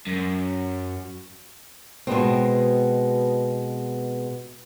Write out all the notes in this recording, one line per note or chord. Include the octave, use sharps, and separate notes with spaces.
F#2
B2 G#3 B3 C4